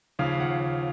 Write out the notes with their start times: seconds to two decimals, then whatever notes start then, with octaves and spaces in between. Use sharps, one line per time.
0.19 D#2 C#3 F3 F5
0.40 F#5